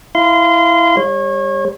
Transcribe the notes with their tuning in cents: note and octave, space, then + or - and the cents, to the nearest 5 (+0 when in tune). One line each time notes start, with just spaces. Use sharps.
E4 +0 F5 -15 C6 -25
G3 +25 C#5 -30